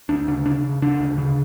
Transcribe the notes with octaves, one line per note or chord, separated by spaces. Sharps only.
D2 D4
C#3 D4
C#3 D4
C#3
C#3 D4
D2
C#3